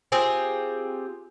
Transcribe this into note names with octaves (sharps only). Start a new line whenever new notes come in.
C4 F4 G4 G#4